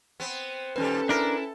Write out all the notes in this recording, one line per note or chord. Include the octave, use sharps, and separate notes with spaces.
B3 C4
D#2 A#2 G3 C#4 A4 B4
D4 E4 A#4